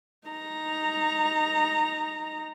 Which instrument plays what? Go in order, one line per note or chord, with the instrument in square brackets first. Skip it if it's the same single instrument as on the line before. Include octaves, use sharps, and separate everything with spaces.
[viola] D#4 A#5